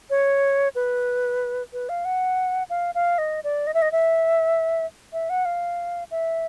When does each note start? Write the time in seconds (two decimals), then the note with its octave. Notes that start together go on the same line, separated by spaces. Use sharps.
0.10 C#5
0.75 B4
1.73 B4
1.89 F5
2.05 F#5
2.70 F5
2.95 F5
3.18 D#5
3.44 D5
3.67 D#5
3.74 E5
3.82 D#5
3.92 E5
5.13 E5
5.30 F#5
5.45 F5
6.11 E5